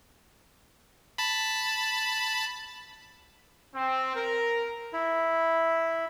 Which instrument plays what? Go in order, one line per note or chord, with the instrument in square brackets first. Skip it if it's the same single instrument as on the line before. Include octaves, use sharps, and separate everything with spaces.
[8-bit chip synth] A5 B5
[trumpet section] C4
A#4
[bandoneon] E4